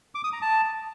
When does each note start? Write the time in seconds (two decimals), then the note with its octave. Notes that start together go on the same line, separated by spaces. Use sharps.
0.15 D6
0.24 D#6
0.33 A#5
0.42 A5